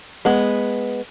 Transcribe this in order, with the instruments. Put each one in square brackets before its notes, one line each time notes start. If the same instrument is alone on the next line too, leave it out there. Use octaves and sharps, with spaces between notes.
[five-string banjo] G#3 B3